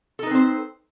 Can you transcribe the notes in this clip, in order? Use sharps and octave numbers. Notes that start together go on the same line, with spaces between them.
C4 D#4 A4 B4 C5